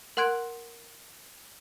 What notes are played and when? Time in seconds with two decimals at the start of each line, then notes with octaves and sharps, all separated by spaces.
0.17 A#4 F#5 C6 F#6 G#6 D7